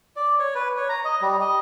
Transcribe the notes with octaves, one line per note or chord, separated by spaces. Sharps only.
D5
C#5
B4
C#5
A#5
D#5
G3
D#5